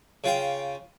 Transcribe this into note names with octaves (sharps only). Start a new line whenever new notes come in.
C#3 F4 G5